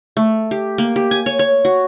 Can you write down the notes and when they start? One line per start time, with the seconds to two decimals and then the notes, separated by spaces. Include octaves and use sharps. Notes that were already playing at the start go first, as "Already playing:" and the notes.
0.17 A3
0.51 G4
0.78 A#3
0.96 G4
1.11 G#5
1.26 C#5
1.39 C#5
1.65 F#4